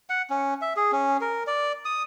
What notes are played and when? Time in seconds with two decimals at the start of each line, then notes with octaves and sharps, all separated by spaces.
0.09 F#5
0.30 C#4
0.61 E5
0.76 G#4
0.92 C#4
1.21 A#4
1.47 D5
1.85 D#6